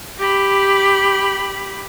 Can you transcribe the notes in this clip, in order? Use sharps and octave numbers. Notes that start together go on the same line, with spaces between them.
G4 B5